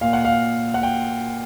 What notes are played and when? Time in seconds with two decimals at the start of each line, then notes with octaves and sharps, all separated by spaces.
0.01 A#2 F5
0.13 F#5
0.25 F5
0.74 F#5
0.83 G5